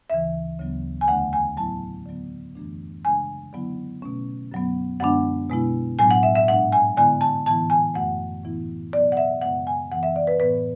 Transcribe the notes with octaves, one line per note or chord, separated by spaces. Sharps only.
D2 C#3 E3 E5
D2 C#3 F#3 B3
G#5
E2 D3 A3 D4 F#5
G#5
A2 F#3 B3 E4 A5
D3 F#3 B3
F#2 E3 A3 D4
C#3 G#3 D4 G#5
D3 F#3 B3 E4
B2 A3 C#4
F#2 D3 F#3 B3
F#2 D3 G#3 B3 D4 F#5
B2 G#3 B3 E4
A2 F#3 B3 D4 G#5
F#5
E5
E5
G#2 G#3 D4 F#5
G#5
D3 G#3 B3 E4 G#5
A5
A2 E3 B3 E4 A5
G#5
F#2 D3 A3 F#5
A2 E3 B3 E4
B2 F#3 B3 D5
F#5
E5
F#2 C#3 G#3 B3 F#5
G#5
F#2 E3 B3 F#5
E5
D5
B4
A2 E3 B3 B4